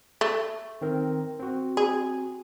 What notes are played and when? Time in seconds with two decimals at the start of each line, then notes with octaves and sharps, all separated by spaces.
0.21 A3
0.81 D#3 C4 A#4
1.39 C4 F#4
1.77 G#4